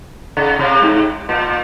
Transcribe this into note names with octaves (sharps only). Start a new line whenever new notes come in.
C#3
C3
G#2
A#2